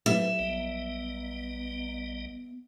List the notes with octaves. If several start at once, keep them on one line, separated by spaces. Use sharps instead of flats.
F#3 E4 G4 B4 C5 E5
A#1 G3 B3 D#5